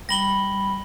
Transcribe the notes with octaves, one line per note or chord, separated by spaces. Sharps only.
G3 B5 A#6 F#7 G7